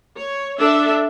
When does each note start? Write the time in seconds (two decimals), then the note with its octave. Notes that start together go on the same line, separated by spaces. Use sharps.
0.17 C#5
0.59 D4 A4 E5